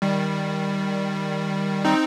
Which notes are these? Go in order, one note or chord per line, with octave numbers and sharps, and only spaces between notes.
D#3 G3
C4 D#4